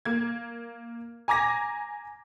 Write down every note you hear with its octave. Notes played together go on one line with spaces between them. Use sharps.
A#3 G#6
G#5 A#5 D6 G#6 A#6